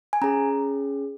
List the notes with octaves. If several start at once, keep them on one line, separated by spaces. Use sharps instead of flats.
G#5
C#4 G#4 A#5